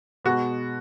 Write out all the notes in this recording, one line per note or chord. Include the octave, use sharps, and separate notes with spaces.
B2 G#3 B3 F#4